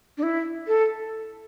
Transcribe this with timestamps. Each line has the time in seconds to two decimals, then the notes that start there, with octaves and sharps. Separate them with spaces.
0.18 D4
0.23 E4
0.67 A4